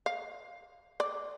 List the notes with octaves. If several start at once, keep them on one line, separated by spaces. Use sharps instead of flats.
F5
D5